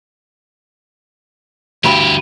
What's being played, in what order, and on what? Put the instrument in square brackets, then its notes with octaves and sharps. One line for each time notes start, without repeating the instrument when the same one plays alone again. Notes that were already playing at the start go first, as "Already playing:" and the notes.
[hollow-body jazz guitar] D2 G2 B5 [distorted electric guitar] E3 G4